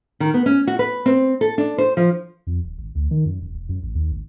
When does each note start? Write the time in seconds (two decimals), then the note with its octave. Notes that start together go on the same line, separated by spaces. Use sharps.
0.20 D#3
0.34 B3
0.46 C#4
0.67 F#4
0.79 B4
1.06 C4
1.41 A4
1.58 D4
1.78 C5
1.97 F3
2.47 F2
2.64 D#1
2.78 G#1
2.95 D2
3.11 D#3
3.25 F#2
3.42 E1
3.55 E1
3.69 F#2
3.83 A1
3.95 D#2
4.12 G#1